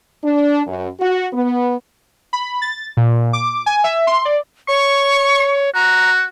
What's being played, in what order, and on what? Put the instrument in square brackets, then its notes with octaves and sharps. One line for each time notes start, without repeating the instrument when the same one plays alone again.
[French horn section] D4
F#2
F#4
B3
[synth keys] B5
A6
A#2
D6
G#5
E5
C6
D5
[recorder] C#5 [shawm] C#6
[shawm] F#4 [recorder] A#5